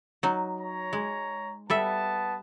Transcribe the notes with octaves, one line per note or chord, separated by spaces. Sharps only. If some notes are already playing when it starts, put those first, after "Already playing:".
F#3 D#4
C#5 A#5
G#3
G3 B3 A4 E5 A5